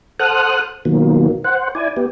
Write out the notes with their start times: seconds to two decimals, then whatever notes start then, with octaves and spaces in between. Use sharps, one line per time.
0.19 A4 C5 F#5 D#6 F6 F#6
0.85 B2 D#3 F3 F#3 A#3
1.44 C5 F#5
1.75 E4 D5 G#5
1.97 B3 G4